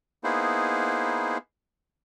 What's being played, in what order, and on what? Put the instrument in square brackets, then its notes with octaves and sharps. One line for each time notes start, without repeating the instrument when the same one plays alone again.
[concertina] A#3 B3 D#4 E4 G#4 C5